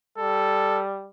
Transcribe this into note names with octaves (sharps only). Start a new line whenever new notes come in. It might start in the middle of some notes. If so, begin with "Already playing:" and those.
G3 A4